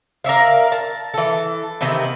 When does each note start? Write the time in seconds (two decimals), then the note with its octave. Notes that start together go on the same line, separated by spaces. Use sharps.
0.24 A#4 D5 E5 F5
0.72 A5
1.14 E3 A4
1.81 C3 D#3 E3 B3